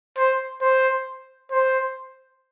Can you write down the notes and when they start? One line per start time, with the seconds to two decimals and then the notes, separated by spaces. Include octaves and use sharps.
0.18 C5
0.62 C5
1.52 C5